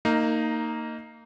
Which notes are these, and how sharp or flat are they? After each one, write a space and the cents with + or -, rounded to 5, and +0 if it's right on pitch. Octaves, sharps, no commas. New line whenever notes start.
A#3 -25 D#4 +0